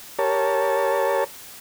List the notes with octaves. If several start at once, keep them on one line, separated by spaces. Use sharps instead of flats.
G4 A#4 C#5 A5